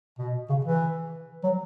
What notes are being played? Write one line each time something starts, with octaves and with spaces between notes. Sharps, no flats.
B2
C#3
E3
F#3